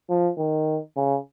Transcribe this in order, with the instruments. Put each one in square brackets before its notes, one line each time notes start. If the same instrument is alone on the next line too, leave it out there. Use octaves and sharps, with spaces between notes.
[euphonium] F3
D#3
C#3